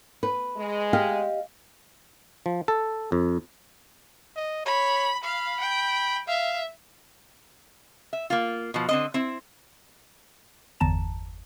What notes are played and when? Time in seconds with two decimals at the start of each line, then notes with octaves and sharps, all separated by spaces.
0.23 B4
0.57 G#3
0.93 G4 D#5 F5
2.46 F3
2.68 A4
3.12 F2
4.36 D#5
4.65 C#5 B5
5.24 F5 B5
5.60 G5
6.28 E5 F5
8.13 E5
8.30 A#3 F4
8.74 B2 F3
8.89 D3 C4 D#5
9.14 C4 E4
10.80 G1 E2 A5 A#5 E7